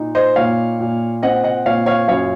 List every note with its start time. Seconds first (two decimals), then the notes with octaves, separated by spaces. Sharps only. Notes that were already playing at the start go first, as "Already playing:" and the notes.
Already playing: A#2 D#4
0.15 C5 D#5
0.36 A#2 C#5 F5
0.80 A#2
1.23 C4 D#5 F#5
1.44 D#5 F#5
1.65 A#2 C#5 F5
1.86 C#5 F5
2.08 F#2 C#5 F5